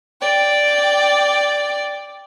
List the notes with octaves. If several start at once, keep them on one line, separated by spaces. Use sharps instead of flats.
D5 G5